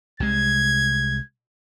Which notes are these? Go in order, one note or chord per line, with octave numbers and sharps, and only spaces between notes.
C2 C3 G#3 G#6